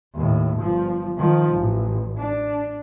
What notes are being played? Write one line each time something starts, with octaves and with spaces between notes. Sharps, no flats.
D#2 A2
G1 F3
D#3 F3
A1
D4